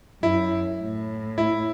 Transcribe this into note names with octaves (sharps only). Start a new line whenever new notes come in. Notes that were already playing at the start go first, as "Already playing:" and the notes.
F#2 E4
A2
E4